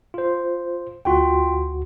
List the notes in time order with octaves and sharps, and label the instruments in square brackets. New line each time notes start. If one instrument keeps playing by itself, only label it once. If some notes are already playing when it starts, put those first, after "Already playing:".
[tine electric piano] F4 C5
[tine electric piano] D2 F#4 [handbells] F4 G5